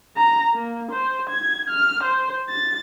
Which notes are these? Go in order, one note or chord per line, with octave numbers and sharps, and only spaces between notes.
A#5
A#3
C5
G#6
F6
C5
A6